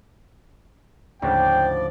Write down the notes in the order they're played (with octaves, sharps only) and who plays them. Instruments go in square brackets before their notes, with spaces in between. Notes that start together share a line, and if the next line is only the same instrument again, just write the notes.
[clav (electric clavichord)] D2 G#2 C#3 [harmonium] F3 D5 [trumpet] G5